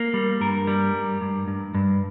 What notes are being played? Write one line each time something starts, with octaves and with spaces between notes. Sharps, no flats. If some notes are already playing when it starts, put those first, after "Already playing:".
Already playing: A#3
G3
G2 A#4
G3
G2
G2
G2
G2